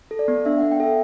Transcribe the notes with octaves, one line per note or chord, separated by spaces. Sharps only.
A4
D5
B3
D4 E5
B3 F#5
G5
A4 E5